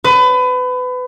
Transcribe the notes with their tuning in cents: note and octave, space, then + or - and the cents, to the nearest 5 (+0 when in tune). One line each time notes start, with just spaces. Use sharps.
B4 +30